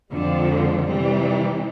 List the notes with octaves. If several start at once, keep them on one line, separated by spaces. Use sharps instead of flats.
F2 D3 F3 G#3
C3 E3 G3